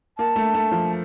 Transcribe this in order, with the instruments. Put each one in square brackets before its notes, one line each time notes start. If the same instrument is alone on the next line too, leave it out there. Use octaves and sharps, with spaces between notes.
[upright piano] A#3 [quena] A5
[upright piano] A3
A3
F3